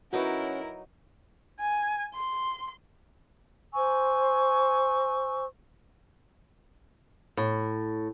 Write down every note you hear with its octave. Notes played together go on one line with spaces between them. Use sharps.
F#3 C#4 D#4 E4 F#4 A#4 B4 F#5
G#5
C6
C5 G#5 C#6 E6
A2